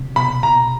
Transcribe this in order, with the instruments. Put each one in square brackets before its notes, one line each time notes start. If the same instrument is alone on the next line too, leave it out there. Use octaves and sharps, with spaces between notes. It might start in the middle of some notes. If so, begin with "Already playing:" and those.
Already playing: [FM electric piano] C3
[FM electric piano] B2 [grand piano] B5
[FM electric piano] B2 [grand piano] A#5